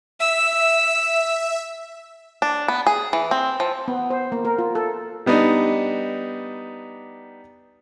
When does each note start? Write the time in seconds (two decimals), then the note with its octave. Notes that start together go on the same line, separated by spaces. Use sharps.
0.20 E5 E6
2.42 D4
2.68 B3
2.87 G#4
3.13 E3
3.31 C4
3.60 F3
3.88 B3
4.10 C5
4.32 A#3
4.45 A#4
4.58 F4
4.75 A4
5.26 G3 B3 D4 D#4